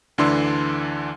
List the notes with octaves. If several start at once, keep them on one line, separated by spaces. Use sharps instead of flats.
D2 D3 E3 D4 C6 E6